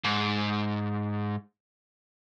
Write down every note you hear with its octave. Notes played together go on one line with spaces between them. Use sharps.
G#2